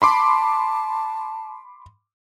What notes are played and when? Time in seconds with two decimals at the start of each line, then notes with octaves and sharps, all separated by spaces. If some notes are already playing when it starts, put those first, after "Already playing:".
0.02 A5 B5 C6 D6